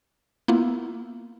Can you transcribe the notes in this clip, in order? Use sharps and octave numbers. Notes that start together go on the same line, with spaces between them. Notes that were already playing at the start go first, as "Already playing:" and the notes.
A#3 B3 E4 F4